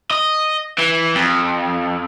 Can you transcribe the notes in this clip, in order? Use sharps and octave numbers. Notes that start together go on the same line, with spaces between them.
D#5
E3
F2